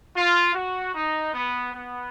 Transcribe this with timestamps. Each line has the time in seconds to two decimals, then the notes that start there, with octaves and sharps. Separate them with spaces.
0.16 F4
0.54 F#4
0.94 D#4
1.33 B3
1.73 B3